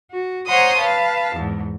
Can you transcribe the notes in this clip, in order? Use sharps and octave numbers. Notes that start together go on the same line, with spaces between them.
F#4
C5 C#5 F#5 A#5 C6 D#6
B4 F5 A5
E2 G#2